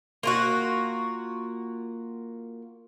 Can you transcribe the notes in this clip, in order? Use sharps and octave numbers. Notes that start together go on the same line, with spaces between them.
A#3 F4 F#4